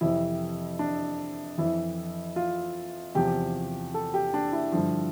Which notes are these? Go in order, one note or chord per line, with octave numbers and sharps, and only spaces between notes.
F2 C3 E3 E4
D4
F2 E3 E4
F4
E2 C3 F3 G4
A4
G4
D4
E4
G2 D3 F3